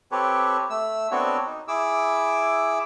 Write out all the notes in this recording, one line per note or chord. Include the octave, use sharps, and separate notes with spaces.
C4 G4 A4 B4 C#5
A3 E6
B3 C4 D4 F#4 A4 C#5
D#4
E4 G#4 D6 E6